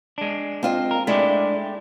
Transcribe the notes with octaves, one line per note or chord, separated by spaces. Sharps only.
G#3 D4
C4 F4 D#5
A#4
G#3 A3 D4 E4 G4